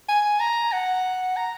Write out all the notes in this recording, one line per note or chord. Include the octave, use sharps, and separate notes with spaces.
G#5
A#5
F#5
A#5